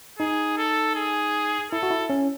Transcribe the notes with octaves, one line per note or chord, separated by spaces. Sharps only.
D#4 G#4
A4
G#4
E4 A4
F#4
E4
C#4